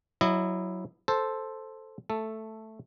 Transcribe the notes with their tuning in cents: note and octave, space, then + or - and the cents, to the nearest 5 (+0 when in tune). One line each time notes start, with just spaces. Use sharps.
F#3 +0 E4 +0 D#5 -25
A4 +0 C5 +5
A3 +0 A4 +0